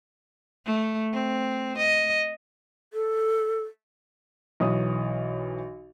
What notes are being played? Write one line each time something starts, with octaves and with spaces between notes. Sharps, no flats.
A3
C4
D#5
A4
B1 E3 C#5 D#6